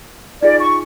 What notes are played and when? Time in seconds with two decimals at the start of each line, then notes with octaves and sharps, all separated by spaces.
0.43 D#4 F4 G#4 D5
0.60 C#6